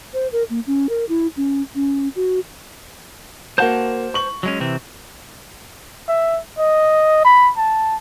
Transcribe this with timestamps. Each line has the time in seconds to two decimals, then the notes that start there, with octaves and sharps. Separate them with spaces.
0.14 C5
0.32 A#4
0.50 A#3
0.67 C#4
0.89 A#4
1.09 E4
1.37 C#4
1.75 C#4
2.16 F#4
3.58 A#3 F#4 C5 A5 G6
4.14 C#6 F#7
4.43 F#3 G#3 C#4
4.60 C3 E3 C4
6.08 E5
6.58 D#5
7.25 B5
7.57 A5